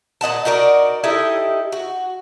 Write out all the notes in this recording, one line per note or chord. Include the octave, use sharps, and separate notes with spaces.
A#2 D#5 F#5 A5
D#4 F#4 A#4 D5
D#4 E4 G4 A4
F#4